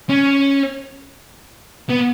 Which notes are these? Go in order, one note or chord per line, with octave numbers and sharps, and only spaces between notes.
C#4
B3